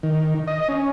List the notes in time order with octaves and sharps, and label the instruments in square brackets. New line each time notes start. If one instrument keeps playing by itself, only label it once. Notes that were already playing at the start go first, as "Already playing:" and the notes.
[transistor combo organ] D#3
D#5
C#4